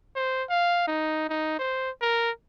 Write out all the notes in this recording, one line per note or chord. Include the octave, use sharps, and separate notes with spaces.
C5
F5
D#4
D#4
C5
A#4